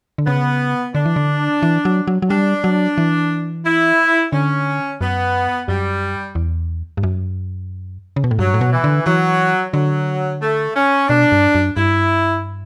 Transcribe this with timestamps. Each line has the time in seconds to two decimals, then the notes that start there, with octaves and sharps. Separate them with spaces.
0.18 D3
0.27 C#3 B3
0.95 D3 D4
1.05 E3
1.16 D3
1.62 E3
1.85 F#3
2.07 F#3
2.22 F#3
2.30 G3 D4
2.64 F#3
2.98 E3
3.65 E4
4.32 D3 C#4
5.01 F#2 B3
5.68 F#2 G3
6.35 E2
6.97 G2
7.03 F#2
8.16 C#3
8.24 B2
8.31 A2
8.39 G2 F#3
8.54 A2
8.61 B2
8.73 E3
8.84 D3
9.06 E3 F#3
9.73 D3 F#3
10.41 A3
10.75 C#4
11.09 B2 D4
11.32 G2
11.55 F#2
11.77 G2 E4